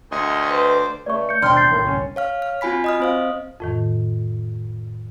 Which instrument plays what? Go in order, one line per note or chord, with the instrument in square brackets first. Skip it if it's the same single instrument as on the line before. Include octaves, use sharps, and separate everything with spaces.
[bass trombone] D2 [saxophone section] D#3 A3 D#5 [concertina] G#5 C6 C#6
[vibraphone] B4 [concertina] C5 D5
[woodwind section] C#2 A3 [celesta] D5 C#6
[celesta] G6 C#7
[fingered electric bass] D#2 B2 [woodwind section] C4 D4 [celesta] D5 F6 [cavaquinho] G5 C6
[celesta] G6 A6 C7
[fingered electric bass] A1 [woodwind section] D#2 A2 D#3
[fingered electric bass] G#1 C#2 G2 [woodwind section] C#4
[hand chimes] C#5 F5 F6
F6
C4 F4 F#4 G#5 B5 B6
D#5 D#6 F6
C4 C5 F5
[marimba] F2 A2 D#3